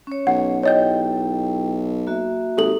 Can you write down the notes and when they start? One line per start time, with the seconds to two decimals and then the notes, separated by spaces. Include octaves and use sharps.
0.07 C#4 C#5
0.27 B1 F#5
0.63 E4 G4 C#5 D#5 G5 G6
2.07 A#3 F#4 E5
2.57 G#1 G4 A4 F#7